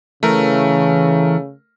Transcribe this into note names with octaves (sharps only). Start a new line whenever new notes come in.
C#3 E3 A3 A#4